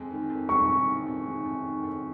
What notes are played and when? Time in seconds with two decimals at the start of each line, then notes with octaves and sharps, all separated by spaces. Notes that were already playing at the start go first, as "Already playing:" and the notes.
Already playing: F2 G#3
0.10 D#3
0.30 F2
0.49 G#3 C#6
0.68 F2
0.87 D#3
1.07 F2
1.26 G#3
1.45 F2
1.64 D#3
1.84 F2